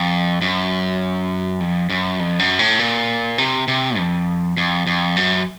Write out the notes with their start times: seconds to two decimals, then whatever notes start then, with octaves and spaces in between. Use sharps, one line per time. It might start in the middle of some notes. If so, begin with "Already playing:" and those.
Already playing: F2
0.41 F#2
1.60 F2
1.90 F#2
2.20 F2
2.39 F#2
2.59 A2
2.79 A#2
3.38 C3
3.68 C3
3.98 F2
4.57 F2
4.87 F2
5.16 F#2